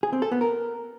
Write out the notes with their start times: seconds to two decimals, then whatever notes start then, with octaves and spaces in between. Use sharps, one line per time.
0.03 G#4
0.13 C4
0.22 A4
0.31 B3
0.41 A#4